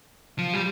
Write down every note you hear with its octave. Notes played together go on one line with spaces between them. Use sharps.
F3
G3